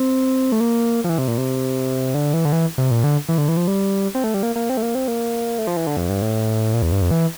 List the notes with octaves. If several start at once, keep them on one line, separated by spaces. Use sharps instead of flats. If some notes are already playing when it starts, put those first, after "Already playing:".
Already playing: C4
A3
A#3
F3
E3
C3
A#2
C3
D3
E3
D3
E3
C3
A#2
D3
E3
D3
E3
F3
G3
C4
A3
G3
A#3
A#3
C4
A3
A#3
C4
A#3
A3
F3
E3
D3
F2
G2
A2
A#2
E2
G2
F2
E3